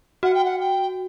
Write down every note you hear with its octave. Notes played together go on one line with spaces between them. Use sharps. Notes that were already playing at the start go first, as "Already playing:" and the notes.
F#4 F#5
G5
F#5
G5